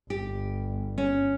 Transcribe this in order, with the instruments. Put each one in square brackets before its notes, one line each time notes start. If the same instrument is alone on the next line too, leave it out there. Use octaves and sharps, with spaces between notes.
[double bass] G1 [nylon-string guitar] G4
[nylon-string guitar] C#4